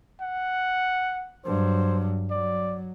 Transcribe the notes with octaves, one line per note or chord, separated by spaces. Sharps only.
F#5
G2 F#3 C5
F#3 D5